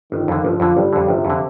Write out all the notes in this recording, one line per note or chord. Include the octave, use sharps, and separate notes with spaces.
G1 D#3
F2 D3
G1 F3
F2 D3
G1 G3
F2 D3
G1 C3
F2
D3